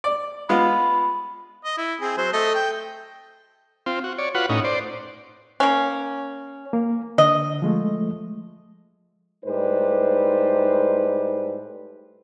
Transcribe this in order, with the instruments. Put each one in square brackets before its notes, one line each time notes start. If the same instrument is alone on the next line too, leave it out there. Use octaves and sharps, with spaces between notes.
[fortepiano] D5
[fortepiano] G#3 B3 F4 [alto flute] B5
[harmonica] D#5
E4
C4 G#4
F#3 C5
A3 A4 D#5
G5
[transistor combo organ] C4 F4
F#4
C#5 D5
F4 F#4 B4 F#5
A2 C#4 D#4
C5 D5
[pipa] A#3 C#4
[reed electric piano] A#3
[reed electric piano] D3 [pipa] D#5
[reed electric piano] F3 G#3 A3
[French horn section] A2 G3 G#3 D#4 B4 C5